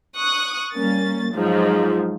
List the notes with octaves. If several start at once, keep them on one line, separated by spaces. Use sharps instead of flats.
C#6 D#6 F#6
G3 A#3 C#4 A6
G#2 F3 F#3